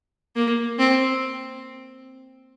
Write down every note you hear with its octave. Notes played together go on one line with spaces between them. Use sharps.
A#3
C4